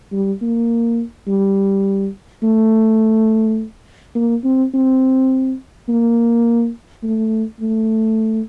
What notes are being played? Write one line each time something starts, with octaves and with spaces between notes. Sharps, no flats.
G3
A#3
G3
A3
A#3
C4
C4
A#3
A3
A3